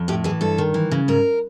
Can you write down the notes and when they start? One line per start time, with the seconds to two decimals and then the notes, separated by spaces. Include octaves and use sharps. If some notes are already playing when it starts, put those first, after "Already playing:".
Already playing: F2
0.08 A2 G4
0.24 E3 G#4
0.41 G2 A4
0.58 D#3
0.74 E3
0.91 C#3
1.08 G#2 A#4